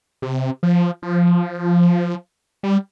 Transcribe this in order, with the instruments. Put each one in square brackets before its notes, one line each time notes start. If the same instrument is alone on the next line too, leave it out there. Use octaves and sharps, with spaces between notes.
[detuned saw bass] C3
F3
F3
G3